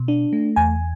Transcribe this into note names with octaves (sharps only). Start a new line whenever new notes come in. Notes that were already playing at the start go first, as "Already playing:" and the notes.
Already playing: B2
D4
A3
E2 G#5